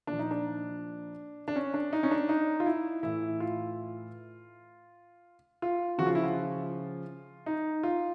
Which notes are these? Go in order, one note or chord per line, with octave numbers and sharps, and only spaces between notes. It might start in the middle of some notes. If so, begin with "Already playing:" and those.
A#2 F3 D4
D#4
D4
D4
C#4
D4
D#4
C#4
D4
D#4
F4
E4
A2 E3 E4
F4
F4
C#3 F3 F#4
F4
E4
F4
D#4
F4